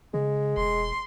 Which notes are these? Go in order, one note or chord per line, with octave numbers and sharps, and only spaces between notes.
C#3 G#3
E1 C6